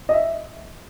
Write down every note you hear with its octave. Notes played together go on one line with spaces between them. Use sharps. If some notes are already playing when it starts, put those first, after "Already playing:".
D#5
E5